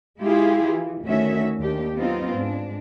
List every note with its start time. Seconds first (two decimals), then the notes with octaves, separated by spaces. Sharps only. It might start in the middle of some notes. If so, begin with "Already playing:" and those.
0.20 G#3 E4 F4 G4 G#4 F5
0.66 E3
1.04 D2 D#3 A3 C#4 F#4 E5
1.59 D#2 D4 G4
1.94 F#3 B3 C4 D#4 F4
2.32 G#2 G#3 D4